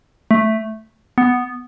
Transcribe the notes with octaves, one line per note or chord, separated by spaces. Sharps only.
A3
B3